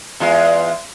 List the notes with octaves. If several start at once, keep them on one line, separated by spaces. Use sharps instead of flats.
E2 G#3 F4